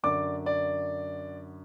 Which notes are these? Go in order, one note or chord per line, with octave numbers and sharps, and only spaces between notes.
F#2 D3 D5 D6
D5